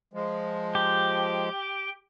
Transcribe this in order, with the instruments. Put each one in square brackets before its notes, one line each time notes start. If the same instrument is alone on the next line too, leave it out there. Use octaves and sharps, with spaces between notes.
[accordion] F3 G#3
[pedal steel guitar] G4